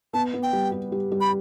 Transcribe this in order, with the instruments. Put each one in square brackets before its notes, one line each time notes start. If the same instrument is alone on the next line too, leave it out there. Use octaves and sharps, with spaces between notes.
[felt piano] B3 [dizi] A5
[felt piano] B3
[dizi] G5
[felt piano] G3
G4
G3
G3
[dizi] B5